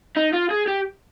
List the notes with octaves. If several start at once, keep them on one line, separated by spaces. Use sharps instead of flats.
D#4
F4
G#4
G4